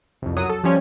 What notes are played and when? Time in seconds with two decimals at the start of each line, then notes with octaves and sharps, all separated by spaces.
0.22 C2 F2
0.37 F#2 F#3 D#6
0.49 A4
0.64 F3 G3 C#4 C#5